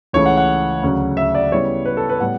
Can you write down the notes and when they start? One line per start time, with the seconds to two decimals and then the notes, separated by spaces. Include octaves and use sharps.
0.13 C#2 C#3 E3 A3 C#5
0.26 F#5
0.37 F#5
0.83 D2 C#3 F#3 C#4
1.17 E5
1.35 D5
1.52 C#3 G3 B3 E4 C#5
1.85 B4
1.97 A4
2.09 B4
2.20 A2 G3 B3 F#5